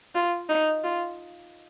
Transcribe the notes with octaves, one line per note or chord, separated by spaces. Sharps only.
F4
D#4
F4